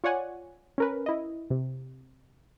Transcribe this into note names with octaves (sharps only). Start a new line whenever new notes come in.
F4 C#5 D5 F#5 G#5
C#4 A#4 B4
E4 D#5
C3